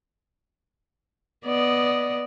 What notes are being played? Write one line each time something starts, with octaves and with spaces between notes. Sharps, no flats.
B3 D5 D#5